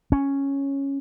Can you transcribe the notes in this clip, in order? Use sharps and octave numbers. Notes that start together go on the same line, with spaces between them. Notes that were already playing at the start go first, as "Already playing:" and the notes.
C#4